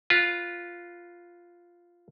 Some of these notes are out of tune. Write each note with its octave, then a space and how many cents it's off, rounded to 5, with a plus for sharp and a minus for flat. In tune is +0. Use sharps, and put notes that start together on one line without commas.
F4 +0 B4 -5